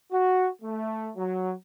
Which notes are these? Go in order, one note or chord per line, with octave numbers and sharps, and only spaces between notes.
F#4
A3
F#3